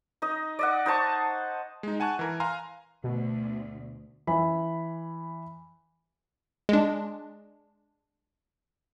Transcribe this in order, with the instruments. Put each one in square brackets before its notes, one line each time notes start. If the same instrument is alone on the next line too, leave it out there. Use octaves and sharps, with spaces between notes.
[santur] D#4 D#5
D5 D#5 F#5
D#4 C5 A5 C#6
[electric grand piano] G#3 D#4
F#5 G#5 A5 C#6 F#6
E3 A#4
F5 G#5 A#5 C6 F6
[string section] D2 [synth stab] B2
[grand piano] E3 B5
[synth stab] G#3 D4